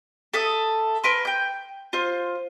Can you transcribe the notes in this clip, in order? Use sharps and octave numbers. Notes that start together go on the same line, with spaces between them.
A4 E5 D#6
A#4 B4 C6
G5 G6
F4 C5